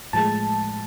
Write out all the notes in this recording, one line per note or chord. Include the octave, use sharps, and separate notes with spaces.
A2 F3 G#3 A5